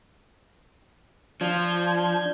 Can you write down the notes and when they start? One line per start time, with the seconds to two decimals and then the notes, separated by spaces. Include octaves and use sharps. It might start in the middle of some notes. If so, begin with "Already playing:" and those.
1.41 F3 D4 G6 G#6